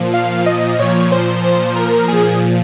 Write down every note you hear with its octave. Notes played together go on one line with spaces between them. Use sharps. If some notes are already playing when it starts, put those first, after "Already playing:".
Already playing: A#2 F3
F5
D#5
A#2 F3 C#5
C5
C5
A#4
A#2 F3 G#4